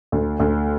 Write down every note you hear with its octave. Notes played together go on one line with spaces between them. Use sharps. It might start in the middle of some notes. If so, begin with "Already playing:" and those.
D2
D2